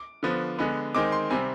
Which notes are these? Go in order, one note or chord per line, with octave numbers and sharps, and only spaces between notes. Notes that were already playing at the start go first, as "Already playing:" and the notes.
Already playing: D6
D3 F3 B3
D3 G#3 B3
D#3 G#3 C4 D6
C6
C3 G3 C4 G#5